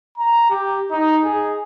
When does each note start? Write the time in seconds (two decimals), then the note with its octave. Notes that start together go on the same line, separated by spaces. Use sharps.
0.18 A#5
0.50 G4
0.91 D#4
1.23 G#4